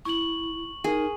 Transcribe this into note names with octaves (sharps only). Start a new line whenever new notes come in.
E4 C#6 F#7
D#4 G#4 A#4